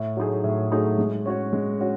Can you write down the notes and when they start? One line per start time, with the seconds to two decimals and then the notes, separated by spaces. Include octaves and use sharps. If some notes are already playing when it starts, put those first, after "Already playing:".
Already playing: A2
0.17 F#3 A3 D#4 G#4
0.44 A2
0.71 F#3 A3 D#4 G#4
0.98 G#3
1.26 C#4 F#4 C#5
1.53 G#3
1.80 C#4 F#4